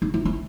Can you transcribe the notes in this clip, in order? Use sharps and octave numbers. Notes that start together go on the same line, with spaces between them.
D#4
E4
E4